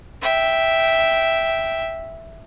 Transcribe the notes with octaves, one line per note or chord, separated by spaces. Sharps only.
E5 G5